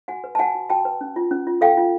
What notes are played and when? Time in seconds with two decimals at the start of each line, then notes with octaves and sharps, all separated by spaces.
0.08 F#4 F#5 G#5
0.24 B4
0.35 A5
0.39 F#4 F#5 G#5
0.55 F#4
0.69 F#4 G5 A5
0.85 B4
1.01 C#4
1.16 F4
1.31 C#4
1.47 F4
1.61 A4 F5 G5
1.77 F4